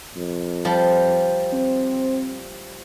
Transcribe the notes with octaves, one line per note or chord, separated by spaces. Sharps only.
F2
F3 G3
C4